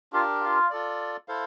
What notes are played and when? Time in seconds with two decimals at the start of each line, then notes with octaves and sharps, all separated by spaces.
0.13 D4 F4 G4 A#4
0.42 F4
0.70 F4 A4 D5
1.28 E4 A4 C5 F5